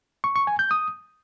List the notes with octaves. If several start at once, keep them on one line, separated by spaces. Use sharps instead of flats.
C#6
C#6
G#5
G6
D#6